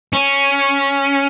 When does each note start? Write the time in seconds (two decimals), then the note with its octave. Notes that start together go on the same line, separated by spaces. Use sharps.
0.13 C#4